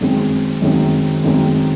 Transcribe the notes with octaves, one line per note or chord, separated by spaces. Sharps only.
F#2 D#3 G#3 C4
F#2 D#3 G#3 C4
F#2 D#3 G#3 C4